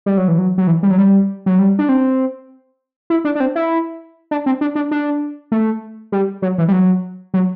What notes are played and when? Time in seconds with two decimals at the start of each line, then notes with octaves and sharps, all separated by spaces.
0.06 G3
0.18 F#3
0.28 E3
0.38 F#3
0.58 F#3
0.67 E3
0.83 G3
0.91 F#3
0.98 G3
1.46 F#3
1.59 G3
1.79 D4
1.89 C4
3.10 E4
3.25 D4
3.35 D4
3.40 C4
3.55 E4
4.31 D4
4.46 C4
4.61 D4
4.75 D4
4.91 D4
5.52 A3
6.12 G3
6.42 F#3
6.58 E3
6.68 G3
6.72 F#3
7.34 F#3